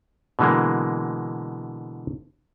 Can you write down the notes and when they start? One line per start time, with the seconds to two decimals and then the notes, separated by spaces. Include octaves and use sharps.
0.39 B2 D3 E3 G#3 A#3